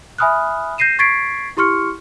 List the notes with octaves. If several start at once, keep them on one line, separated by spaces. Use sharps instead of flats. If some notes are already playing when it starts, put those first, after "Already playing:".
E5 G#5 B5 D#6 F6 F#6
G6 A#6 C7 D#7 E7
C#6 G#6 A6 B6 C7 D7
E4 G4 C6 C#6 F6 C#7